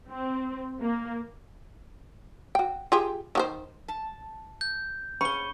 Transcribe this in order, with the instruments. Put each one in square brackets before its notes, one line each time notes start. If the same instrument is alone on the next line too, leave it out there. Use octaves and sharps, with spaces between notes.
[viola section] C4
A#3
[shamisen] F#4 G5
F4 G4 G#4
D#3 G4 C5
[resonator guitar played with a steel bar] A5
[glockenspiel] G6
[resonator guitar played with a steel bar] C#4 G#4 [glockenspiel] B5 G7 [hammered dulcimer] C#6